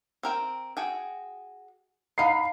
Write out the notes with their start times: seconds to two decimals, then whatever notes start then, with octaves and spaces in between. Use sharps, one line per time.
0.23 C4 A#4 G5
0.77 F#4 G#4 G5
2.18 D#4 F5 F#5 B5 C7